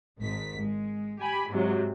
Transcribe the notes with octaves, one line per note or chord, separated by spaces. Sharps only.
G#1 G#2 B6
G#3
G4 G#5 B5
G#2 C3 F#3